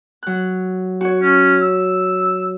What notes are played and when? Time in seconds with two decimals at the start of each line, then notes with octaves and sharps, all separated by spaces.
0.23 F#3 F#6
1.01 F#4 C#5
1.22 C#4
1.62 E6